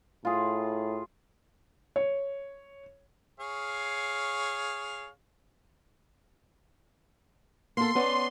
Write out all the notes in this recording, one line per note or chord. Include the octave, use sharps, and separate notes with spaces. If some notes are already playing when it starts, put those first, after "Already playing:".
A2 F4 G#4
C#5
G#4 C#5 F5
A#3 A4 C6
B3 C#4 D5